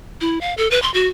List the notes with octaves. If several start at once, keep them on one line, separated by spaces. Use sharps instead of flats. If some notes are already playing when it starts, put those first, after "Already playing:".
E4
F5
A4
B4
C6
F#4